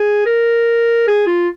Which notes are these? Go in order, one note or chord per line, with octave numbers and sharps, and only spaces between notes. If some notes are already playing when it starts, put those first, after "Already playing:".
Already playing: G#4
A#4
G#4
F4